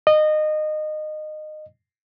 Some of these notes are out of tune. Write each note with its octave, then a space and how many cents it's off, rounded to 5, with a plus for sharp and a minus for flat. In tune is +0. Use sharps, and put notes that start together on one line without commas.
D#5 -20